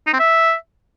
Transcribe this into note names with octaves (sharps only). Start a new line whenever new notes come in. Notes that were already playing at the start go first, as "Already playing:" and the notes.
D#4
C4
E5